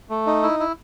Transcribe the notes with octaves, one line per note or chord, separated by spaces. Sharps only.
A3
D#4
E4
E4